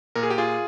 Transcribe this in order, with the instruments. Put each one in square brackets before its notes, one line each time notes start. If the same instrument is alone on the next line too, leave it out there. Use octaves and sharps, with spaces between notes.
[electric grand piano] A#2 A#4
G#4
G4
F4 G#4